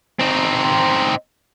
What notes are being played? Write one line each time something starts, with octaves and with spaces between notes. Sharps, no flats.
C4 D#4